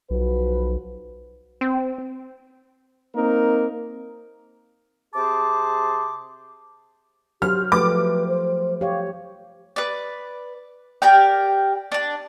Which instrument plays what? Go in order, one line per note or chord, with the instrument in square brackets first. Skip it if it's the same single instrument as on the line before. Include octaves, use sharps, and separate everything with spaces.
[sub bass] B1 [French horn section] F3 F#4 B4
[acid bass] C4
[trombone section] A#3 C4 D#4 A#4
[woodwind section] C3 G#4 C5 A5 D6
[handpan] F#3 F#4 C5 [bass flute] G4 [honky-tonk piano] F6
[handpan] F3 A3 G4 [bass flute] B4 [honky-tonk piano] D6
[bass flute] C5
[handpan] G4 C#5 [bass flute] F5
[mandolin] B4 D5
G4 A#4 D5 G5
D4 D5